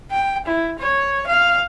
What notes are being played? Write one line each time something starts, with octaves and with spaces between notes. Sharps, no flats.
G5
E4
C#5
F5